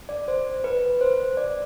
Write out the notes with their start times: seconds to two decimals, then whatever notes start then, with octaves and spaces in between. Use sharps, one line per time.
0.09 D5
0.28 C5
0.64 B4
1.01 C5
1.37 D5